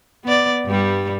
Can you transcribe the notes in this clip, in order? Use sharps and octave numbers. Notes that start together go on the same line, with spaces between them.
B3 D5
G2 G3